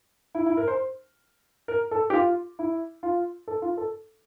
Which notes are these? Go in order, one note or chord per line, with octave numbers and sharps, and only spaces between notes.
E4
E4
A#4
C5
A#4
A4
G4
F4
E4
F4
A4
F4
A4